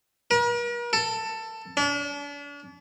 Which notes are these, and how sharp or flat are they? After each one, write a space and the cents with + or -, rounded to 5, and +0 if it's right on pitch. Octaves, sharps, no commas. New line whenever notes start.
A#4 +45
A4 +15
D4 -40